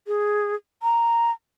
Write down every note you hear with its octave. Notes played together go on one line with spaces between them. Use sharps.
G#4
A#5